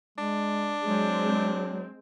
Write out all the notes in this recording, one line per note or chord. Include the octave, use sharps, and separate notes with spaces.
G#3 D4
F#3 G#3 C4